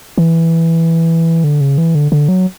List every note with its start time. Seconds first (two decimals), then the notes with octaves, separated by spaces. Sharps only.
0.18 E3
1.44 D3
1.61 C#3
1.78 E3
1.95 D3
2.12 D3
2.29 F#3